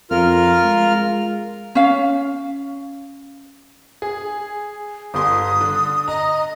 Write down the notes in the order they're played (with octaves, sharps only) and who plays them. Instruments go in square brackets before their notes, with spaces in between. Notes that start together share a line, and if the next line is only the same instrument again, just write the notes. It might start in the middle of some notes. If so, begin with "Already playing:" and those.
[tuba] F2 [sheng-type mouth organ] F4 A#4 F6
[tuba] G#3
[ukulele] C#4 F5
[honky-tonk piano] G#4
[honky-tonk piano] G1 G3 C6 [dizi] D#6
[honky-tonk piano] D3
[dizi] D#5 [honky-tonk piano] A#5